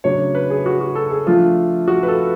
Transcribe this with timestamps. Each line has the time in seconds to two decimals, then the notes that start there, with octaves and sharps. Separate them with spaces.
0.04 C#3 F#3 A3 D4 C#5
0.35 B4
0.50 G#4
0.66 F#4
0.81 F#4
0.95 A4
1.11 G#4
1.26 F3 A3 D4 F4
1.88 F#4
2.03 B4
2.08 A4